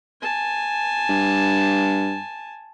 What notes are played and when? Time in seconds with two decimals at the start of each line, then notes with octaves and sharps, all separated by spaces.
0.22 G#5 A5
1.10 G2